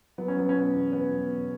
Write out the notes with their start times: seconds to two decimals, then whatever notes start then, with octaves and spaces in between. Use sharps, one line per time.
0.18 F#3 B3
0.28 C#4
0.37 F#3 B3
0.49 C#4
0.55 B2 B3
0.74 E2
0.93 B2 B3
1.11 F#3
1.30 B2